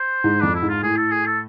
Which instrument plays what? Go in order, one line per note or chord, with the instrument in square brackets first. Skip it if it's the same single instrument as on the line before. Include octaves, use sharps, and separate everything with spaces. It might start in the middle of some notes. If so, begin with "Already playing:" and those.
Already playing: [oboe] C5
[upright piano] G#2
[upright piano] F2 [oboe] D4
[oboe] E4
[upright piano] G#2
[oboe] F4
[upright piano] A2 [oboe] G#4
[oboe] A4
G#4
A4